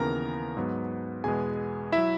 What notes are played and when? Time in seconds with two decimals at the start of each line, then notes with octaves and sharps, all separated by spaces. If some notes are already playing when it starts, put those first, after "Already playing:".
Already playing: D#2 C#3 E3 B3 A#4 A#5
0.57 G#2 F#3 B3
1.24 E2 B2 G#3 B3 G#4 G#5
1.92 F#3 E4 E5